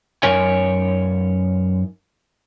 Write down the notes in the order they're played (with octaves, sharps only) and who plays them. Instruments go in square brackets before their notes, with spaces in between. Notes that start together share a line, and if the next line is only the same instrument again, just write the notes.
[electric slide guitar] F#2 D#4 A#4 C#5 G#5